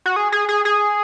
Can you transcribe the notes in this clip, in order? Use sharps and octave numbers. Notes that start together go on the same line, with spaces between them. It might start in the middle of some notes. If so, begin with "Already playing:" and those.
F#4
G#4
G#4
G#4
G#4